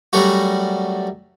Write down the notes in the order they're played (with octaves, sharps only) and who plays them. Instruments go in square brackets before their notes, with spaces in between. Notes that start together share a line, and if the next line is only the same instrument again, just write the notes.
[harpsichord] F#2 F#3 G3 A3 F#4